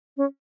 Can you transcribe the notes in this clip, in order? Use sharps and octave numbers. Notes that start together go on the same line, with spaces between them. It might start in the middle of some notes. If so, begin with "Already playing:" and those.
C#4